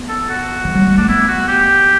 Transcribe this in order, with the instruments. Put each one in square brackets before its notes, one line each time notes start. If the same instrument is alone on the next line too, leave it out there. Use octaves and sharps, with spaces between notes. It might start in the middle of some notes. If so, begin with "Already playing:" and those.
Already playing: [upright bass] B3
[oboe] A4
F#4
[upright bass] E3
F#3
G3
[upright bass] A3 [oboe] D4
[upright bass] B3 [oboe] E4
[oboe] F#4
G4